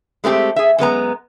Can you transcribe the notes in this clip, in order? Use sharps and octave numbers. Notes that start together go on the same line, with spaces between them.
G#3 A3 C4 G4
G#4 E5
F#2 G#3 B3 A#5